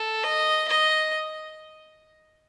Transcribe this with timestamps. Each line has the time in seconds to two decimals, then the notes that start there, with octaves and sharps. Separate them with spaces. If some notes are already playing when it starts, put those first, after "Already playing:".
Already playing: A4
0.24 D#5
0.68 D#5